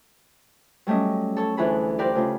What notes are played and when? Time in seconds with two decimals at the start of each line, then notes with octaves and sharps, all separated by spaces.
0.87 F#3 G3 A3 C#4 D#5
1.36 A4 C#5 A5
1.57 D2 E3 F4 G#4 A4 B5
1.98 C4 F4 G4 A#4 B4 D5
2.15 C#3 A3 F4